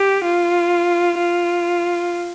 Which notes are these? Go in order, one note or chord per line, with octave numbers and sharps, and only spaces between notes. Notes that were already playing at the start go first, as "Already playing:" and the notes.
Already playing: G4
F4
F4